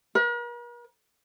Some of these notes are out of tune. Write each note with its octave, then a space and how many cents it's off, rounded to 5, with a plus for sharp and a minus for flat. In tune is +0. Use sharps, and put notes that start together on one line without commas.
A#4 +45